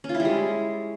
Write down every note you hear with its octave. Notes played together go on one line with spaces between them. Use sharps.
C#4
F4
E4
G3
G#3